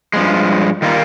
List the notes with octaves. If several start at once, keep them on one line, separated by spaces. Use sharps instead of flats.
G2 F3 G#3
D#3 G3 A#3 F4